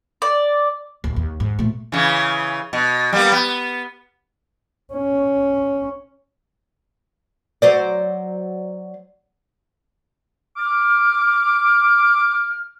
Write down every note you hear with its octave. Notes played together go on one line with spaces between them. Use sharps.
D5
D1
D#2
G#2
A#2 A3
C#3 E3
B2
G3 A#3 B3
B3
C#4
F#3 C5 D5
D6 F6